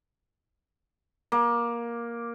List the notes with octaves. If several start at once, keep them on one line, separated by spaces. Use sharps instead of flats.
A#3